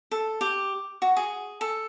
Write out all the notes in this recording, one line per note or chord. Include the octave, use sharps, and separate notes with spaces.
A4
G4
F#4
G#4
A4